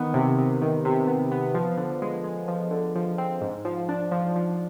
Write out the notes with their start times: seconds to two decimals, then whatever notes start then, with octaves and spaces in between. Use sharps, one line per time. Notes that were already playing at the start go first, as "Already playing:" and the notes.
Already playing: D#3 B3
0.14 C3
0.38 C3
0.62 D#3
0.85 C3
1.07 B3
1.32 B3
1.55 F3
1.77 D3
2.02 G#3
2.24 G#3
2.48 F3
2.71 D3
2.95 F3
3.18 C4
3.41 G#2
3.65 F3
3.89 D4
4.12 F3
4.36 F3